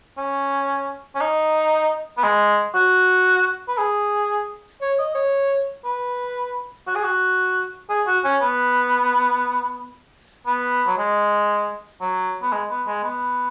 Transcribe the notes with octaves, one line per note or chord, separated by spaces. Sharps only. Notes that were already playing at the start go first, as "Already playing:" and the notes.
C#4
C#4
D#4
B3
G#3
F#4
B4
G#4
C#5
D#5
C#5
B4
F#4
G#4
F#4
G#4
F#4
C#4
B3
B3
F#3
G#3
F#3
B3
G#3
B3
G#3
B3